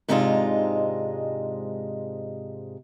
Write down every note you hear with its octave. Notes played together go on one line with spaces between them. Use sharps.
G#2 C3 G#3 D4 D#4 F4